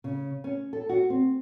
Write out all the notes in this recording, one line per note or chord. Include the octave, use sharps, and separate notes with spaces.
C#3
C#4
A4
F#4
C4